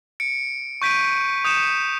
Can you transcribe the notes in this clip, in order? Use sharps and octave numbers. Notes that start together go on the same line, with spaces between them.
C#7 D7
C#6 G6 B6 D7 D#7
D#6 G6 C#7 E7